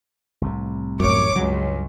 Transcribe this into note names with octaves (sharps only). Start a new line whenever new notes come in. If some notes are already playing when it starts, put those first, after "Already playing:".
C2 A2 C3
A1 F#2 C#5 D6
C#2 G2 C#3 F#3